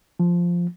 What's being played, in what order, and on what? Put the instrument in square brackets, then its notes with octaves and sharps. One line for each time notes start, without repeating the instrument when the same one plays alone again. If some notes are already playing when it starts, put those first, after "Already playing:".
[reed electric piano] F3